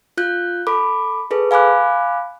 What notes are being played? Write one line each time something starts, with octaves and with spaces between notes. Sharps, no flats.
F4 F#6 G6
A4 B5 D6
G#4 A4 B4
F5 G#5 B5 D6 F#6